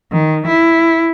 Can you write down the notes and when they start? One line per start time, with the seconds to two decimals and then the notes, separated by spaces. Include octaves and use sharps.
0.12 D#3
0.48 E4